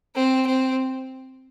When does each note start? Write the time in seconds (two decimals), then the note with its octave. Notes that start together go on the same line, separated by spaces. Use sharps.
0.16 C4
0.47 C4